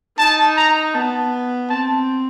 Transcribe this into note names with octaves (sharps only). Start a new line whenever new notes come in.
D#4 A5
A#5
B3 A5
C4 A5